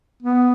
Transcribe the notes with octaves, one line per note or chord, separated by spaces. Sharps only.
B3